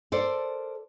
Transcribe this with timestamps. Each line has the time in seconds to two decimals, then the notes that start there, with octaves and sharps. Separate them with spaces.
0.12 A4 A#4 C5 D5